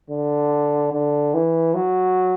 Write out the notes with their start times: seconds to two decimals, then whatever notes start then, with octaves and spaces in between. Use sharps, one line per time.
0.10 D3
0.93 D3
1.34 E3
1.74 F#3